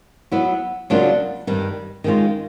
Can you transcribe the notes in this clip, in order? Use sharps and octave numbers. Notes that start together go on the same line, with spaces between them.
F#3 B3 E4
C#3 F#3 A#3 D4 F4
G2 D#3 G3
D#3 G#3 C#4 F4